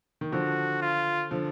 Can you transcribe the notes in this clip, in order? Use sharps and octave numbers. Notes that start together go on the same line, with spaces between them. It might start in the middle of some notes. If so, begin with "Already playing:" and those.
D#3
D3 F3 F#4
F4
D3 F3